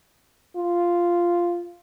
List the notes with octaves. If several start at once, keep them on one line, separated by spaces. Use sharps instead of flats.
F4